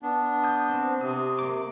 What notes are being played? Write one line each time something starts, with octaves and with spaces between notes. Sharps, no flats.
B3 D4
D#6 G6
C4
C3 D#6
A#3 D6